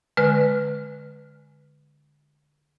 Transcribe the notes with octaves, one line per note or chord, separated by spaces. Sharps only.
D3 G#3 B4 F6